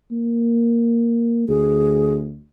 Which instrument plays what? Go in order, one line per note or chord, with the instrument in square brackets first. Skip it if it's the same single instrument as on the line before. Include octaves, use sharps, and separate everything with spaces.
[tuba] A#3
[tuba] D2 [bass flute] G#4